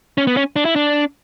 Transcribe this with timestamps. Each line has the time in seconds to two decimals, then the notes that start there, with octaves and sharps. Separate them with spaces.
0.18 C#4
0.27 B3
0.37 C#4
0.56 D4
0.65 E4
0.76 D4